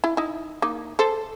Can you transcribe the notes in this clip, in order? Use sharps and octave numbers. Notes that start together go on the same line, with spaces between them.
E4
D#4 E4
A#3 D#4
A4 C5